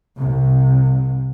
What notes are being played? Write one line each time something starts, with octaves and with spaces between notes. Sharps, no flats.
C2 C3